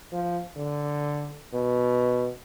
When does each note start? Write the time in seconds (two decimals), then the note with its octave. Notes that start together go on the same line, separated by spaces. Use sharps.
0.13 F3
0.57 D3
1.54 B2